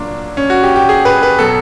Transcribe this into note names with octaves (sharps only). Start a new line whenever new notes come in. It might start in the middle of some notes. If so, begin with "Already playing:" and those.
Already playing: A#2 F#3 D4
C#4
F#4
G4
G4
G#4
B4
B4
B2 F#3 A4